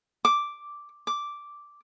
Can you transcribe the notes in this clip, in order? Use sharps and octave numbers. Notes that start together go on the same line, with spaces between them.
D6
D6